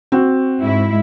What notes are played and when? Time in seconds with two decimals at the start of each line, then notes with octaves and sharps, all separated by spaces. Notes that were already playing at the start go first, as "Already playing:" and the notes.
0.12 C4 F#4
0.61 G#2 G#3 E4